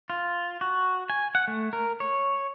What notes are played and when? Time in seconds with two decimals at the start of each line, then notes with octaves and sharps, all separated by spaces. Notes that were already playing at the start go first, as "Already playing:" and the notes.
0.10 F4
0.61 F#4
1.10 G#5
1.35 F#5
1.48 A3
1.73 A#4
2.00 C#5